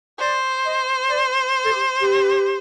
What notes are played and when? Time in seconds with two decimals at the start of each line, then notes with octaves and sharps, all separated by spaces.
0.19 C5 D5
0.65 D#5
1.10 D5
1.65 A4
1.71 G4
2.02 G4